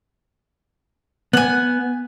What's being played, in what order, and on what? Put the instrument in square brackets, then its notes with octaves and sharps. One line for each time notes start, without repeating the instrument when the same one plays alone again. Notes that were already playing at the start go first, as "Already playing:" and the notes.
[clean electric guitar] B3 [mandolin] F#5 G#5